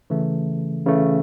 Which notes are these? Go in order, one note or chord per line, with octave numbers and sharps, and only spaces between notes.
C#3 E3 A3
C#3 E3 A3